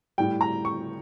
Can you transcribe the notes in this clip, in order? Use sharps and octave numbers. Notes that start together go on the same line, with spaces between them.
A2 G3 G5
A#5
C#6